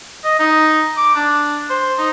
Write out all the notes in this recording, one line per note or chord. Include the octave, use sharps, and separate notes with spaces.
D#5
D#4
D6
D4
C5
D#4